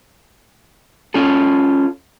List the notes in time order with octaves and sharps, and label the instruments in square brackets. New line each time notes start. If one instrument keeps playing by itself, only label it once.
[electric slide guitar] C#4 F4 A4